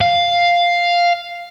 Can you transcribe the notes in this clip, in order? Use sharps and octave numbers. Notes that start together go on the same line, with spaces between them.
F5